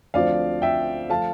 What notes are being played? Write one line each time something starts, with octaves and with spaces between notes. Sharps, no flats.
D2 D3 F3 C4 D5 F5
E5 G5
F3 A3 F5 A5